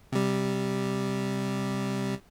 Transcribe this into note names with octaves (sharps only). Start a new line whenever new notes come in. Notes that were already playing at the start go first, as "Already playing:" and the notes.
C3 G3